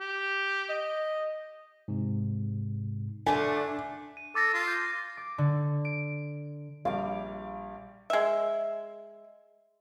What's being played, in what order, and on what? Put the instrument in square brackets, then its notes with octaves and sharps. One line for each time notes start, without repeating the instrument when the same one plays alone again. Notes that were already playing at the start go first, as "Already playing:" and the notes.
[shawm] G4
[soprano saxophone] D#5
[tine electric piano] G#2 C3
[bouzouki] D3 A3 [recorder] D4 [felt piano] G#5
[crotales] D#7
[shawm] A4 [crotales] D6 A6 A#6
[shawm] F4
[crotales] G6
[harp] D6
D3
D7
[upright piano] A#1 G3 [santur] F5 D6
[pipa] G#3 E5